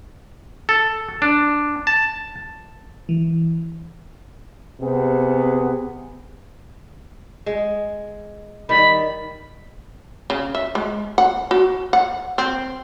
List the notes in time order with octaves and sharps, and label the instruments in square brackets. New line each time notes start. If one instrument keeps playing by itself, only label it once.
[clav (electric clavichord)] A4
D4
A5
[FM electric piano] E3
[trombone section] C3 B3 C4 G#4
[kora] G#3
[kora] D#3 G3 [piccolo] B5
[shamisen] C#3
E5
G#3
F#5
F#4
F#5
C4